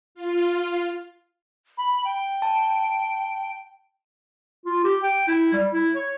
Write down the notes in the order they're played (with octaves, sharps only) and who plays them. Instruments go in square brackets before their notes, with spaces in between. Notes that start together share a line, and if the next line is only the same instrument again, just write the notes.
[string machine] F4
[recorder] B5
G5
[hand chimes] A5
[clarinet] F4
G4
G5
E4
G3
E4
C#5